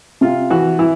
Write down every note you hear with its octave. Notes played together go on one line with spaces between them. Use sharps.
C3 F4
E3 F#4
E3 E4